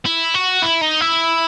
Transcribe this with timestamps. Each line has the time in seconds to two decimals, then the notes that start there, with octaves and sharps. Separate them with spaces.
0.06 E4
0.35 F#4
0.62 E4
0.81 D#4
1.01 E4